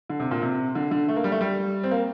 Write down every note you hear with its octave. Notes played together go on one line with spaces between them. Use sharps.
D3
C3
A#2
C3
D3
D3
A3
A#3
G3
A3
G3
C4
A#3